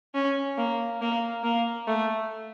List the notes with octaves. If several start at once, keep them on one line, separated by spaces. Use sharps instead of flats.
C#4
A#3
A#3
A#3
A3